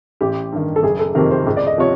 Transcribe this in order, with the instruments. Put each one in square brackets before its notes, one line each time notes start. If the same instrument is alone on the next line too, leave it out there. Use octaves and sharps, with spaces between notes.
[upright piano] A1 G4
G2 D#3
A4
F#1 G#4
A4
F2 C3 D#3 A#4
C5
C#2
D5
D#5
C3 F3 C#5